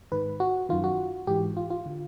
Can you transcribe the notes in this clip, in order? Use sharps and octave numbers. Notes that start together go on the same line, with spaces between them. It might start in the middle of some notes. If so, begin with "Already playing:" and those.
G#2 D#3 B4
F#4
F#2 D#3 F4
F#4
G#2 E3 G4
F4
F4
D3